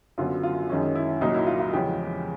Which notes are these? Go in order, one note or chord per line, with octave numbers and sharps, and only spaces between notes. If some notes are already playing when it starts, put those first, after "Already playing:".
F#2 D3 F#3 B3 F4
F4
F#2 D#3 G#3 C#4
E4
C2 A#2 F#3 A#3 D#4
E4
F4
F4
E2 C#3 F3 G#3 C#4 G4